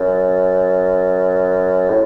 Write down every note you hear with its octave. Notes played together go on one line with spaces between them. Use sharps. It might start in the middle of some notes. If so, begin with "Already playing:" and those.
Already playing: F#2
A2